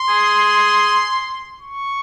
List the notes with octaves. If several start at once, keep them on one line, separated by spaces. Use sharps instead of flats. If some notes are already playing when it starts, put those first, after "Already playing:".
Already playing: C6
G#4
C#6